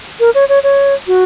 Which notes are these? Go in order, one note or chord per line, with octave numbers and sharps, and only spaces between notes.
A#4
C#5
C#5
C#5
F#4